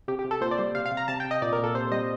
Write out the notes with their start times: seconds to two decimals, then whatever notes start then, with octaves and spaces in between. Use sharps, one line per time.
0.08 C3 G4
0.19 G4
0.24 C3
0.31 A4
0.41 A#2 C5
0.51 D5
0.58 G3 C5
0.75 C3 F5
0.86 F5
0.91 C3
0.97 A#5
1.08 C3 A5
1.20 C3 G5
1.31 D#5
1.42 A#2 D5
1.53 A#4
1.58 A#2
1.64 A4
1.74 C3 C5
1.92 G3 D#5